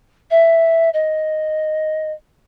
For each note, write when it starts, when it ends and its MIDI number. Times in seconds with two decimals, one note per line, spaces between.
0.30 0.89 76
0.93 2.12 75